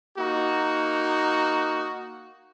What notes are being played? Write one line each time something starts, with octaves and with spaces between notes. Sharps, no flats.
A#3 D#4 F#4